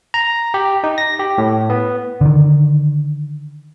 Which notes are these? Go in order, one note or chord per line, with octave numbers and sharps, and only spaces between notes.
A#5
G4
D#4
A#6
G4
A2
B3
D3 D#3